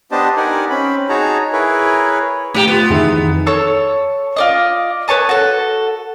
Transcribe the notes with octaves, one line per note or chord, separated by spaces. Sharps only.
B3 D4 G4 C5 D#5 A5
D#4 G4 A#4 D5 F#5 G#5
C4 C#4 B5
D#4 F#4 G#4 C#5 A5 A#5
E4 G#4 A#4 B4 C#5
A2 A#3 G4
B3 F4
F2 D#3 E3 D#4 G#4 E5
A4 C#5 A5 E6
F4 D5 D#5
B4 C#5 A5 D#6
F#4 A4